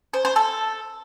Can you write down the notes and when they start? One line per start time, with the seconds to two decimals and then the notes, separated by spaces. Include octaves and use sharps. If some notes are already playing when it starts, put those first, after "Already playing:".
0.14 C5
0.25 C5
0.36 A4